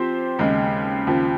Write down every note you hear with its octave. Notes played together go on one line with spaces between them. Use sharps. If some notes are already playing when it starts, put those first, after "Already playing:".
Already playing: F3 C4 G4 C5
D#2 C#3 G#3
D#2 C#3 F3